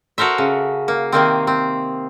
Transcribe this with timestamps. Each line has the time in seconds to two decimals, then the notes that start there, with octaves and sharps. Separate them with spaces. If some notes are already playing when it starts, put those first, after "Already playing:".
0.18 F#4 A4 A#4 C5 E5
0.38 C#3
0.88 A#3
1.12 C3 D#3 A#3 C4
1.47 C4